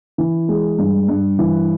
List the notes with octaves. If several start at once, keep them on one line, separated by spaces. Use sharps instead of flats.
E3
G#3
G2
G2
E3